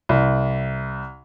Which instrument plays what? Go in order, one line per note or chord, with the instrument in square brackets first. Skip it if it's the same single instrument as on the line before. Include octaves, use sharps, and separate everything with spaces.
[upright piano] C2